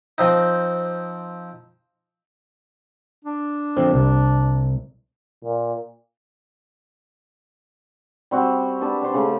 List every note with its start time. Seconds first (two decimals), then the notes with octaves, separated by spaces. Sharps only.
0.18 F3 C4 D#4
3.25 D4
3.77 D3 F3 C4
3.94 C2
5.44 A#2
8.31 G3 C4 F#4
8.81 G3 D4 B4 A5
9.02 D4 C5
9.14 C#3 A3